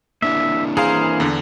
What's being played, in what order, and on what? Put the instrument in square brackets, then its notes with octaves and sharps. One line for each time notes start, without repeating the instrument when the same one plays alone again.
[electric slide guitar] A#3 D4 E4 [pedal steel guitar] E5
[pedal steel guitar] E3 A#4 C5 [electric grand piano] G#4 F5
[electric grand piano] E2 D3